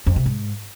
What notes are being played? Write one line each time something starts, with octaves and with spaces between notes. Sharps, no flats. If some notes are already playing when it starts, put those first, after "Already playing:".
F2
C3
G#2